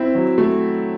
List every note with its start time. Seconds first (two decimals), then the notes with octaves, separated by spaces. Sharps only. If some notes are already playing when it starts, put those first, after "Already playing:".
Already playing: C4 E4
0.15 F#3
0.38 A3